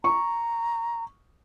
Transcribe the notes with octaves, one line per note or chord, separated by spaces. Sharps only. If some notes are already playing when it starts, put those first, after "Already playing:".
A#5 C#6